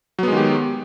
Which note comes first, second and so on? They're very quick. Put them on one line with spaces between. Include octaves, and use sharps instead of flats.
F#3 B3 G#3 D#3 G4